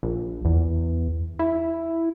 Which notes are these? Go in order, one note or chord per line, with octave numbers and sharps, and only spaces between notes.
A#1
E2
E4